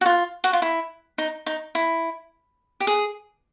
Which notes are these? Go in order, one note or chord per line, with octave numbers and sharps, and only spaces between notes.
F#4
F4
F#4
F4
E4
D#4
D#4
E4
G4
G#4